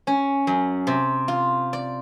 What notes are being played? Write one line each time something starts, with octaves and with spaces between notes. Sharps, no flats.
C#4
F#2
C3
F4
D5